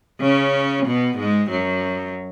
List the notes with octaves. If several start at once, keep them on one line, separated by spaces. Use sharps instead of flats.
C#3 C#4
B2 B3
G#2 G#3
F#2 F#3